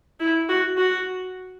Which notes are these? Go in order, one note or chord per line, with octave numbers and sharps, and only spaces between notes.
E4
F#4
F#4